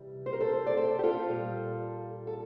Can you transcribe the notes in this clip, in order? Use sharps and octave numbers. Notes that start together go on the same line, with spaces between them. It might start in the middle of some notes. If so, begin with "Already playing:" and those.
Already playing: C3 E3 G3
C5
A#4
A4 C5
D5
A4 C5
G4
F4 A4
A#2 G3
A4